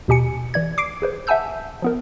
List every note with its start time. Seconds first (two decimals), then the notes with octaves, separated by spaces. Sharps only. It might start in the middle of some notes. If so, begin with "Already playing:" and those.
0.08 D#2 B2 G4 G#5 C#7
0.54 E3 D5 G#6
0.78 D6 C7 D7
1.02 G#4 B4 C5
1.27 E5 F#5 G#5 A5 E6 G6
1.82 F3 B3 A#4